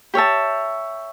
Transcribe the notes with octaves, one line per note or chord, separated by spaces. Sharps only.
G4 C#5 E5 A5